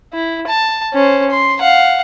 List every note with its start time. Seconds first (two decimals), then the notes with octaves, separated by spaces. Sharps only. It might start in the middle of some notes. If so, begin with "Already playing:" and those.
0.14 E4
0.47 A5
0.93 C#4 C5
1.31 C6
1.61 F5 F#5